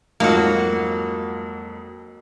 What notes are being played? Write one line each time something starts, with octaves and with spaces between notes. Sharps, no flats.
F2 G#2 F#3 A#3 F#4